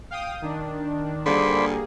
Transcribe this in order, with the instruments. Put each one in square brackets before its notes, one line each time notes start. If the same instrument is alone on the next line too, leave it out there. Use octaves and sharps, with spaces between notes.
[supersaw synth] F5 G5 D#6
D#3 D4
[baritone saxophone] D3 [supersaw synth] G3 A#3 G#4 [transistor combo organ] C5 D5 B5